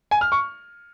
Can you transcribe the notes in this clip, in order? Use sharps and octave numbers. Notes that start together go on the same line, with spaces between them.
G#5
F6
C#6